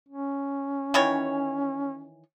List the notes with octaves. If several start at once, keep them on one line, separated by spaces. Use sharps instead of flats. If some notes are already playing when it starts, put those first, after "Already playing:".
C#4
D#3 E3 C#5